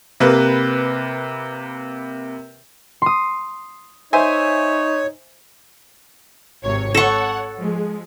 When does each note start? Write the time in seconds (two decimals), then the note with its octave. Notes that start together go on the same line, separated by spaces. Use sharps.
0.20 C3 A#3 B4
3.02 C6 D#6
4.13 D#4 C5 C#5 E5 G#5
6.63 G#1 C3 C#5
6.94 A4 C#5 F#5 C#6
7.55 F3 G#3